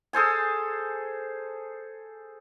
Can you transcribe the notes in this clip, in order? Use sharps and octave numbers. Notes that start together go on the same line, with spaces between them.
G#4 A4 C5 G#5